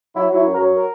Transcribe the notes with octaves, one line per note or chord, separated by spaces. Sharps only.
F#3 E4
F#3 E4
F#2
A#4
F#3
A#4